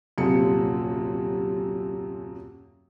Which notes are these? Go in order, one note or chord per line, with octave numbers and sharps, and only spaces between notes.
D#1 F#2 C3 C#7